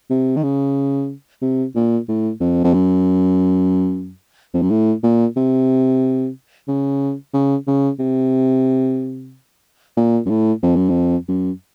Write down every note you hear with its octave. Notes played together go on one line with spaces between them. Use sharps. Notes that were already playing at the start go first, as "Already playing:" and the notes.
C3
D#3
C#3
C3
A#2
A2
F2
F2
F#2
F2
F#2
A2
A#2
C3
C#3
C#3
C#3
C3
A#2
F#2
A2
F2
F#2
F2
F#2